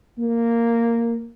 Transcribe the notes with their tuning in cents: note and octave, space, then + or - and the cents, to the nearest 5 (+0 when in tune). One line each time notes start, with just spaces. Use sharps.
A#3 -5